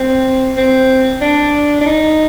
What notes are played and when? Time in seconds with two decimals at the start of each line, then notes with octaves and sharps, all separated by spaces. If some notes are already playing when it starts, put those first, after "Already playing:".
Already playing: C4
0.57 C4
1.21 D4
1.81 D4
1.86 D#4